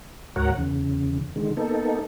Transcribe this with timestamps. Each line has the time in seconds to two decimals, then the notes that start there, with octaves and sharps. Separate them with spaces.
0.36 D2 G#2 F#4 A#4 C#5 F#5
0.58 E2 C#3
1.36 D3 D#3 G#3
1.57 A#3 B3 D#4 A4